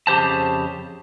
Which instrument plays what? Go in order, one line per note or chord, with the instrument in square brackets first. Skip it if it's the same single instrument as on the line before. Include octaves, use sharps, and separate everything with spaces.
[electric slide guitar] F2 C#3 G4 C5 A5